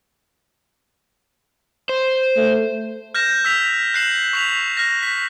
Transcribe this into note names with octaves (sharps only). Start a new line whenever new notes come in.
C5
A3
F6 G6 A#6 E7
E6 B6 F7
F#6 A#6 C7 E7 F#7
C#6 B6 F7
F6 A#6
B6